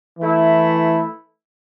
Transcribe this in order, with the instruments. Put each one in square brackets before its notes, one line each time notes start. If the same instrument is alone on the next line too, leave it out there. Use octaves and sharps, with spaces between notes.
[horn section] E3 A3 E4